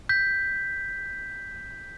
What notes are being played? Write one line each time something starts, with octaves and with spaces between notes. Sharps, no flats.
G6 B6